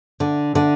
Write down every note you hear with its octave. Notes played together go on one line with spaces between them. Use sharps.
D3
D3